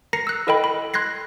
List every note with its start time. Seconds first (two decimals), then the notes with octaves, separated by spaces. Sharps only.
0.13 A#4 A#5 A#6 C7 C#7
0.27 E6 F#6
0.47 E4 A4 A#4 D#5 G5 B5
0.64 B5
0.94 C6 F#6 G#6 A#6 C7